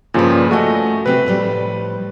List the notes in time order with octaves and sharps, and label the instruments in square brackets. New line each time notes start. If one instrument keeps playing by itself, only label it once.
[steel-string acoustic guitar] G2 B4 [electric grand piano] A#2 C#3 F3
[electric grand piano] A3 F#4 [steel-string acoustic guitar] D#5 G#5
[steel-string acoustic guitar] C3 C4 G4 [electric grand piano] B4
[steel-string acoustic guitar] A2 F3 G3